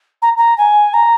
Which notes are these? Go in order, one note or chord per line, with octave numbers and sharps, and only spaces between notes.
A#5
A#5
G#5
A#5